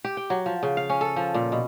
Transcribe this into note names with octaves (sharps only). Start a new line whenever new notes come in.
G4
G5
F#3
F3
C#3
F5
C#4
A4
F3
A#2
B2